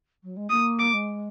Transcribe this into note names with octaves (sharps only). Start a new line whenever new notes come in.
F#3
G#3
A#3 D#6
D6
G#3